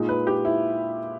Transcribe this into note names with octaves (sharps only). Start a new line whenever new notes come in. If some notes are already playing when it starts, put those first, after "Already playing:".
Already playing: A#2 G#3 D#4
B4
G4
E4